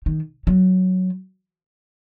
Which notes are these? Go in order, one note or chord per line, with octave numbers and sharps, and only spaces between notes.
D#3
F#3